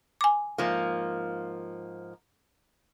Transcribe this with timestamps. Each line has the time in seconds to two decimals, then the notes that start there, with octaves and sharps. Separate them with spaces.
0.21 G#5 D6
0.58 G#2 F3 A#3